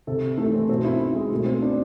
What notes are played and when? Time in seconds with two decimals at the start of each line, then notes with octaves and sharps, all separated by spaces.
0.07 C3 A4
0.38 E3 A3
0.53 C4
0.69 B2 C4
0.85 E4
1.00 E4
1.15 G#3
1.31 B2 A3
1.46 C4
1.62 D4